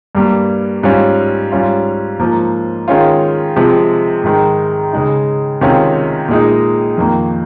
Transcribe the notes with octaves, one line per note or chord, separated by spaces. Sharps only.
G2 G3 A#3
G#2 G3 C#4 F4
G#2 G3 C#4 F4
G#2 F3 A#3
D#3 G#3 C#4 F4
C3 F3 G#3
G#2 D#3 G#3
C#3 G#3 D#4
C3 D#3 G#3 C#4 F4
A#2 G#3 D#4
F2 D#3 A#3